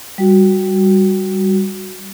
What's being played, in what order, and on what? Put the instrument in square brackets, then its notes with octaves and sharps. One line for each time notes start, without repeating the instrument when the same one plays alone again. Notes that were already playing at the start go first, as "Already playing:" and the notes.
[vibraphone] G3 F#4